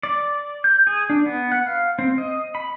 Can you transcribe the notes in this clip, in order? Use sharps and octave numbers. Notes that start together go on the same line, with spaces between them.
D5
G6
G#4
D4
B3
F#5
F5
C4
D#5
B5